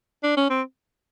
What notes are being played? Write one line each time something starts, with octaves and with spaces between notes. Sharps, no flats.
D4
C#4
C4